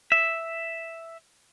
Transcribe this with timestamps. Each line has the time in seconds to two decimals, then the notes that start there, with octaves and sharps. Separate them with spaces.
0.12 E5